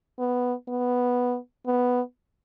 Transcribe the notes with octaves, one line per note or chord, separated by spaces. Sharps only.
B3
B3
B3